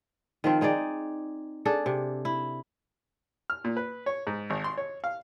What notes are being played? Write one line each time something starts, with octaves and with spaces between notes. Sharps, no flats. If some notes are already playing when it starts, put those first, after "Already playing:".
D#3 F3 C4
C4 D#4 G#4 D5
D4 G#4 A4
C3
E4
F6
A#2
B4
C#5
G#2
G#1
C6
C#5
F5